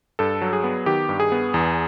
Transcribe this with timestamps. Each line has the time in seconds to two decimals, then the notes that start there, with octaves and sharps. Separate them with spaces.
0.19 G2 A4
0.42 F#3
0.53 G#4
0.64 B3
0.86 D#3 G4
1.09 G2
1.20 G#4
1.32 B3
1.54 E2